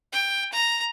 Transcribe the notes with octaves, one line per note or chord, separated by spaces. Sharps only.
G5
A#5